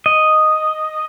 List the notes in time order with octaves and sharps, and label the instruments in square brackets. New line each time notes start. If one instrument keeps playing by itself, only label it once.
[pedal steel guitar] D#5